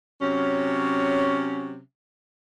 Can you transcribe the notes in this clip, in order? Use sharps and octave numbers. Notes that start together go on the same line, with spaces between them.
C3 F#3 C#4